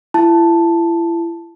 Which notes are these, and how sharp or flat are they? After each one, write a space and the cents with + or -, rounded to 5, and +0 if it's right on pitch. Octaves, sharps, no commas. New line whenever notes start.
E4 +35 A5 +0